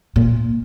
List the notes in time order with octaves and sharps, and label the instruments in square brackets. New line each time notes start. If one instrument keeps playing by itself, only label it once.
[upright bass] A#2